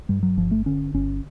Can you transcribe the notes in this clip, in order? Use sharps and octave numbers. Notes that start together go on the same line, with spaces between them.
G2 G3
F#3
G1 F3
A3
D3 C#4
G1 C#4